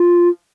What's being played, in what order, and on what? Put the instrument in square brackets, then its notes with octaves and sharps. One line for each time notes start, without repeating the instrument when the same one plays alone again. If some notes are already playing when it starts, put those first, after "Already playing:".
Already playing: [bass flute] F4